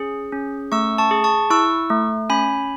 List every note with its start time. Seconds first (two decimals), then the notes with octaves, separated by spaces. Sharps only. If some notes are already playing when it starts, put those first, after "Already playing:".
Already playing: C#4 G#4
0.32 C#4
0.72 A3 C#6 E6
0.98 A5 C#6
1.11 G#4
1.24 A5 C#6
1.50 E4 C#6 E6
1.90 A3
2.30 C#4 G#5 B5